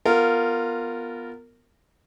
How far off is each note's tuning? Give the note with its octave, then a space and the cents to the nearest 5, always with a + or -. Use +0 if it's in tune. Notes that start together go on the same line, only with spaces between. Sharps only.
B3 +0 F4 +0 A#4 -20